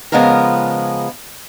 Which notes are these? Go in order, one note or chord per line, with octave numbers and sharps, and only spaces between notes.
C#3 F3 G#3 B3 F4 A#4